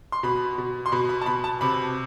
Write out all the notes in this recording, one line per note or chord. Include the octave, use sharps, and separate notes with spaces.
C6
B2 B5
B2
C6
B2 B5
B5
A5
B2 B5
A5
C3 B5